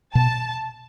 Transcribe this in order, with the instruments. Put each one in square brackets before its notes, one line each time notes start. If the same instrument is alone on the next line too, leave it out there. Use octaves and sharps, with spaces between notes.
[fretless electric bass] B2 [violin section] A5